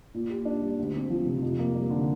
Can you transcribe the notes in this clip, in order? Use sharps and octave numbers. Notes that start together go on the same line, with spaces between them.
A#2
G4
D4
G3
D2
C4
F3
C3
F2
A#3
G3
D3